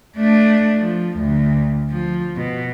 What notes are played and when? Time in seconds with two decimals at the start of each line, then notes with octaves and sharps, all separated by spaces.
0.16 A3 D4
0.77 F3
1.18 D2
1.90 F3
2.36 B2